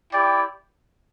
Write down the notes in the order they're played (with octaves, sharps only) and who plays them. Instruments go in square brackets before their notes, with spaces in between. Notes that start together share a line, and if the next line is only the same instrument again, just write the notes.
[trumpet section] E4 G4 D5 G5